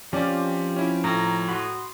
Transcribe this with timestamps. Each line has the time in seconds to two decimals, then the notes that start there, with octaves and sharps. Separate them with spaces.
0.13 F3 C4 C#4 F4 G4 D5
0.76 C#4 E4
1.04 A2 A#5
1.49 F#4 B5 C6 D#6